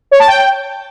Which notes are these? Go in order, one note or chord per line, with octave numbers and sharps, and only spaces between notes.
C#5
A5
G5